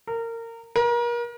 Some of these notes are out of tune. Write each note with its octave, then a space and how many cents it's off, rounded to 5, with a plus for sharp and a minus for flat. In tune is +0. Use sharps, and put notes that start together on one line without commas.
A#4 -25
A#4 +35